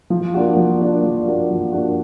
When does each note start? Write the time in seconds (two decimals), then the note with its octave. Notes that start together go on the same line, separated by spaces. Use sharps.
0.10 F3
0.34 A#3 D4 F#4
0.57 F3
0.80 A#3 D4 F#4
1.03 F3
1.27 A#3 D4 F#4
1.50 F3
1.72 A#3 D4 F#4